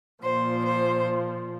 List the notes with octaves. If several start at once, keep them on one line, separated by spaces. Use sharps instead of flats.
A#2 F3 C5
C5